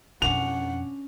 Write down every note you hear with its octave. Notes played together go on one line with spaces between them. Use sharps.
F2 B2 C#4 D4 F#5 F7